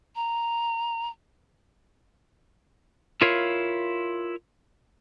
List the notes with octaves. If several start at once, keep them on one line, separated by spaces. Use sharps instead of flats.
A#5
E4 F4 A#4 C#5 F5